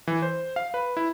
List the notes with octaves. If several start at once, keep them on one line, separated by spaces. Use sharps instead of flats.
E3
C5
F5
B4
E4